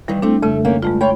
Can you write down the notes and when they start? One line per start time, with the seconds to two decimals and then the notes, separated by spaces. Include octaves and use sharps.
0.08 G2 D#3 E3 G3
0.22 A3 C4 D4
0.42 F2 C#3 A3
0.65 D#3 A#3 C#4
0.82 G2 G#3 A3 F4
1.01 F4 C#5 G5 B5